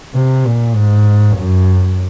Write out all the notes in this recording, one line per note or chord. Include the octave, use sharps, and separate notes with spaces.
C3
A#2
G#2
F#2